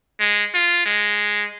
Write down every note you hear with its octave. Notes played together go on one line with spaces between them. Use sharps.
G#3
F4
G#3